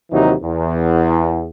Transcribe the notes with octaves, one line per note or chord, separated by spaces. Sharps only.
D#2 C3 E3 F#3 D#4
E2